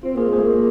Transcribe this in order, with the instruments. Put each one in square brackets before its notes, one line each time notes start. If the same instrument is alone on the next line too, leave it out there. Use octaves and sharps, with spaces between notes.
[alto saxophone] C4 [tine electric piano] F4
[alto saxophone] A#3 [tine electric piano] F4 G#4
[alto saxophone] G#3
[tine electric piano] G#4 C5
[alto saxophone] A#3